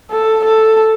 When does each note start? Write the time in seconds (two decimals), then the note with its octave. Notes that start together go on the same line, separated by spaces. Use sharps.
0.10 A4
0.45 A4